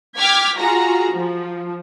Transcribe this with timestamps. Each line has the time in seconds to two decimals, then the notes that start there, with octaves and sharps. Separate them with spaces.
0.19 G5 D6 F6 G#6 B6
0.59 F4 F#4 G#4 A#5
1.14 F3